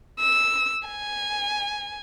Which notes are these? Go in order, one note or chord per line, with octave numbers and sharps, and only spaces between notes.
E6
G#5